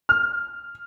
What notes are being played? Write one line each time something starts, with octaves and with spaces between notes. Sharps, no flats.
F6